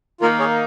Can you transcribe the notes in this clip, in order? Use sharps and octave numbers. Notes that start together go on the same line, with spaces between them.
D#3 A#3 D#4 F4 A#4
G#4 C#5